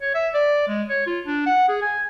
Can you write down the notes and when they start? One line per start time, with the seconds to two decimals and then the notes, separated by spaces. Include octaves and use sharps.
0.01 C#5
0.14 E5
0.34 D5
0.68 G#3
0.89 C#5
1.07 F4
1.27 D4
1.46 F#5
1.69 G#4
1.82 G#5